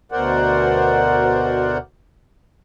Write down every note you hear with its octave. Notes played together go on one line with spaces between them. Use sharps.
D2 B2 A#4 C5 D5 F#5